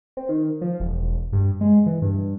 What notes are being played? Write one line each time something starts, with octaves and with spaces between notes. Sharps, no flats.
C4
D#3
F3
E1
G2
G#3
E3
G2